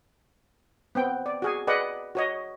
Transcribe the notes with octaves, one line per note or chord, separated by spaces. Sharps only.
B3 C4 G5
D5
F#4 G#4 G#5
G#4 B4 D5 D#5 F#5
F#4 C#5 D#5